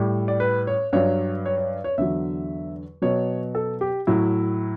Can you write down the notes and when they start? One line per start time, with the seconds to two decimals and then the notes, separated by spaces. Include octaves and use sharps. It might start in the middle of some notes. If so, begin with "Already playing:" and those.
Already playing: A2 G3
0.28 D5
0.40 B4
0.67 C#5
0.93 G2 F#3 C#5
1.46 C#5
1.58 C#5
1.84 C#5
1.98 E2 D3 F#3 E5
3.02 B2 F#3 C#5
3.55 A4
3.81 G4
4.07 A2 F#3 E4